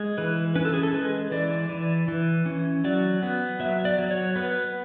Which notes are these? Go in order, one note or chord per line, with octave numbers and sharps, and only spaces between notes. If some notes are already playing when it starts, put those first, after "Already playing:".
Already playing: G#3
E3 B4
C#4 B4
A4
G#4
A4
G#3 B4
E3 D5
E3
E3
C#4
F#3 D5
B3
F#3 E5
D5
F#3
C#5
B3 B4